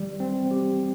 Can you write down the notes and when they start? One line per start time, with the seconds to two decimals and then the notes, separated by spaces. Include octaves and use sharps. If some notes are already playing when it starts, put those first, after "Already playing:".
Already playing: E3 G3
0.20 C4
0.51 G4